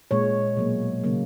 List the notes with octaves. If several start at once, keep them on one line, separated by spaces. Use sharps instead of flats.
A#2 G#3 C#5
B2 F#3 A#3
C#3 F#3 A#3